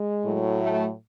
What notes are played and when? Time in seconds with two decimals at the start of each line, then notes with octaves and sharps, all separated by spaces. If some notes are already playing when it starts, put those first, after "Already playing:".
Already playing: G#3
0.24 A2 F#3
0.60 A3